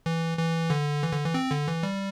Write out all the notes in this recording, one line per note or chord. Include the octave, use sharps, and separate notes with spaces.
E3
E3
D3
E3
D3
E3
C4
D3
E3
G3